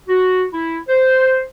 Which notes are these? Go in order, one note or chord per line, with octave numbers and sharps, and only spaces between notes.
F#4
E4
C5